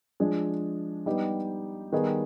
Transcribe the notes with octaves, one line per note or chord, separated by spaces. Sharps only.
F3 G#3 D4 G#4
G3 B3 D#4 G4
D#3 G3 B3 D#4 G#4